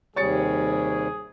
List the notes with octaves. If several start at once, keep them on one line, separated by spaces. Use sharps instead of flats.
D#2 C3 G3 G#4 C#5 A6 C#7